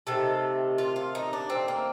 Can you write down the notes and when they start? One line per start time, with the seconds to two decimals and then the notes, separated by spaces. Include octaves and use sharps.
0.07 C3 D#3 A3 A4
0.78 F4
0.96 F4
1.15 D#4
1.33 D4
1.50 C4
1.68 A#3